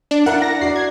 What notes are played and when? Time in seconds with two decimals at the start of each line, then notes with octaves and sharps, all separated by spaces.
0.11 D4
0.26 D4 E4 A#4 F#5
0.42 A#6
0.61 F#4 D5 C7
0.76 G#6